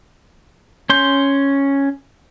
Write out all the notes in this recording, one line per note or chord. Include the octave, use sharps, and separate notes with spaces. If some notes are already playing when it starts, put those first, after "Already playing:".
C#4 C6 G6